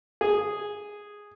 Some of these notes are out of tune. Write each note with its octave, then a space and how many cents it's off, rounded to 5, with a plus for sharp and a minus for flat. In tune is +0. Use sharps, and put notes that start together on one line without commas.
G#4 -5